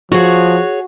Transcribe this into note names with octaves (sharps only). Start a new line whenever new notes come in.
F3 F#4 G#4 C#5